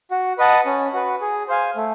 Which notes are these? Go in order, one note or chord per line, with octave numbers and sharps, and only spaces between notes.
F#4
B4 D#5 F#5 A5
C#4
F#4 B4
G#4
C5 F5 G#5
A3